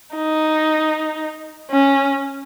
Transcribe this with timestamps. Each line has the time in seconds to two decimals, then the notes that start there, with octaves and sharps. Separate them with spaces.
0.16 D#4
1.71 C#4